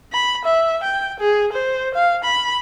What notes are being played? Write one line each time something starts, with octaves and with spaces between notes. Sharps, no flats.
B5
E5
G5
G#4
C5
F5
B5